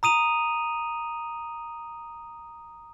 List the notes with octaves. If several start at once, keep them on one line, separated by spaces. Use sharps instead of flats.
A#5 D#6 D#7 F7